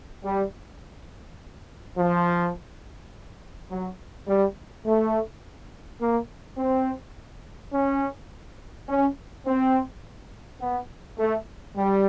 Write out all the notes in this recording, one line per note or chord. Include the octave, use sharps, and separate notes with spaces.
G3
F3
F#3
G3
A3
A#3
C4
C#4
C#4
C4
B3
A3
G3